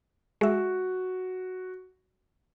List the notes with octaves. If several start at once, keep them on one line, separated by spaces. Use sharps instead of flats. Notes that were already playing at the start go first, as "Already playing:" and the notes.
G#3 F#4 E5